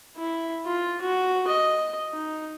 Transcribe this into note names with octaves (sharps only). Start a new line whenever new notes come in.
E4
F4
F#4
D#5
D#4